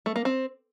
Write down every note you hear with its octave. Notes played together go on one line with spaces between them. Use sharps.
A3
A#3
C4